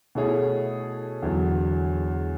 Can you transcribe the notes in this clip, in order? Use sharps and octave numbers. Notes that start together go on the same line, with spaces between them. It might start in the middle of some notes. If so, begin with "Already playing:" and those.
B2 A3 E4 G#4 C#5
E2 D3 F#3